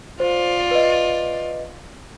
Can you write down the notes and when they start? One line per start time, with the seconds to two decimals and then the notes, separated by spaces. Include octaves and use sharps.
0.20 F4 C5 D5
0.71 B4 D#5